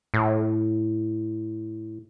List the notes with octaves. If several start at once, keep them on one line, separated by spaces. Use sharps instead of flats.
A2